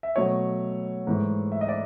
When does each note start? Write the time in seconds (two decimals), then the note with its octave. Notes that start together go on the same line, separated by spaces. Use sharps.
0.03 E5
0.16 B2 F#3 A3 C#5 D#5
1.07 G#2 E3 A3
1.52 E5
1.61 D#5
1.69 D5 E5